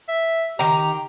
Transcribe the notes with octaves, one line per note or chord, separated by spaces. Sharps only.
E5
D#3 G4 A#5